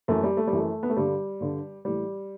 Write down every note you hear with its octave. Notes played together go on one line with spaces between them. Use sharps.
F#2 E3 A3
G3
A3
G3
F#2 E3 A3
B3
A3
G2 D3 G3
G2 D3
A2 E3 G3